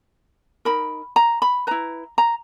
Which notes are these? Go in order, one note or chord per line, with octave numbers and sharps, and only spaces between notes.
D#4 A#4 B5
A#5
B5
E4 B4 A#5
A#5